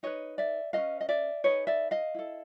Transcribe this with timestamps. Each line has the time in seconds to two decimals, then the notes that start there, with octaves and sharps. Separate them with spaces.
0.03 D#4 G#4 B4 C#5 D#5
0.38 D5 E5
0.73 C#4 F#4 B4 D#5 F5
1.01 D#5
1.09 D5 E5
1.44 D#4 G#4 B4 C#5 D#5
1.67 D5 E5
1.91 D#5 F5
2.14 E4 A4